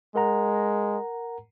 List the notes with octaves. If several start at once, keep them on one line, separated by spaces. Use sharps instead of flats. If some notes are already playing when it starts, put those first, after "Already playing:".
G#3 A#4 F#5 A#5